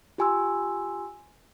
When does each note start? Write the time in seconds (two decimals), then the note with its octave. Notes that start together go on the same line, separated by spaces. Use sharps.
0.18 F4 G4 G#5 C6 E6